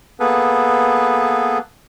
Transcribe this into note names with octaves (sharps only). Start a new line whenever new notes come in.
A#3 B3 G#4 A4 B4